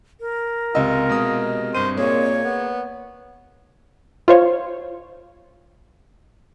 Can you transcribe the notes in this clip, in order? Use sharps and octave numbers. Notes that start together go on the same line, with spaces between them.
A#4
C#2 C3 F4 D#5 E6
B2 G#3 D#6
G2 C5 D#7
A#2 A#3 G#4 C#5
B3
F4 C5 C#5